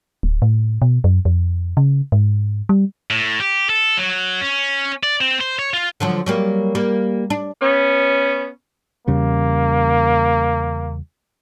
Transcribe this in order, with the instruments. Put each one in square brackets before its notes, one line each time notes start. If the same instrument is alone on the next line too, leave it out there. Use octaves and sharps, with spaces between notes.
[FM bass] D1
A2
B2
F#2
F2
C#3
G#2
G3
[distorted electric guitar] A2
G4
A4
F#3
C#4
D5
C4
C5
C#5
F4
[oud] D3 F3 F#3
F#3 G3 A#3
G3 A#3
D4
[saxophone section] B3 C#4
[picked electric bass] E2 C#3 G3 [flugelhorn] A#3